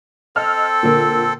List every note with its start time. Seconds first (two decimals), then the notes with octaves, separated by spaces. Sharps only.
0.36 C4 A4 D#5 E6 F6
0.83 A#2 D3 A#3